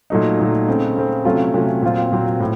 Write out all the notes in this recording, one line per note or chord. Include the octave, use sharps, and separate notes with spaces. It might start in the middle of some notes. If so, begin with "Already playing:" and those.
A#2 F#3 A3 D#4
A#2 F#3 A3 D#4
C#3 A3 C4
C#3 A3 C4
C3 F#3 A3 C#4 F4
C3 F#3 A3 C#4 F4
A#2 F#3 C4 F4
A#2 F#3 C4 F4
A2